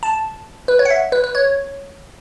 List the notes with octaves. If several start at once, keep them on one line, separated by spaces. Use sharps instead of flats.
A5
B4
C#5
F#5
E5
B4
B4
C#5